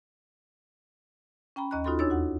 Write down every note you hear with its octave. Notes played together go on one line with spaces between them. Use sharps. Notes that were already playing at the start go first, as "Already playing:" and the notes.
C#4 G5 A#5 B5
D#2 C#4 D#5 A#5 F#6
D#4 F4 F#4 A4 B5 C6
E2 D4 D#4 C#5 E6 A6
F#4 F#5